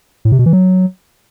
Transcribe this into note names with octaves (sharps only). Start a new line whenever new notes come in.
A2
C3
B2
E3
F#3